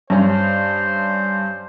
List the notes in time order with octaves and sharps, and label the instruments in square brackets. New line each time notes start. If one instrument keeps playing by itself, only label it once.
[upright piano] G2 C#4 [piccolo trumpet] C5